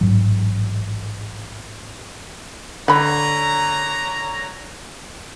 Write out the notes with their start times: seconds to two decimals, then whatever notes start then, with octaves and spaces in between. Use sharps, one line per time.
0.01 A1 G#2 F#3
2.88 D3 C#5 F#5 A#5 B5